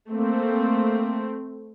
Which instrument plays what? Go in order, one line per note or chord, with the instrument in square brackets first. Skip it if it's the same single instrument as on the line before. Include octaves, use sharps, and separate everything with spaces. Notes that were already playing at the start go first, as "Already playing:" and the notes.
[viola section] A3 C4 [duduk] A#3